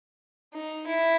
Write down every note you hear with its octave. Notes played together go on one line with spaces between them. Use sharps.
D#4
E4